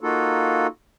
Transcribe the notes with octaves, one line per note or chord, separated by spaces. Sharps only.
A#3 D#4 F4 F#4 A4